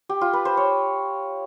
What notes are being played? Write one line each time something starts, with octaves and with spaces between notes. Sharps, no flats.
G4
F4
B4
C5
C#5